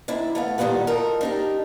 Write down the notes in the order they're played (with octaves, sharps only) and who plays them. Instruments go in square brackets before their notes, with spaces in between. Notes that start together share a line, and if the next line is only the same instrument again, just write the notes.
[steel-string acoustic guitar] D#3 D4 E4
A3 B3 F5
A#2 D#3 G3 G#3 B3 G4
D#4 F4 A4 A#4
D4 D#4 G4